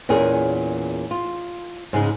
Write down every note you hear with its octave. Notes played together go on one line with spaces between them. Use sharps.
E2 A#2 C#4 G#4 A#4
F4
G#2 C#3 G#3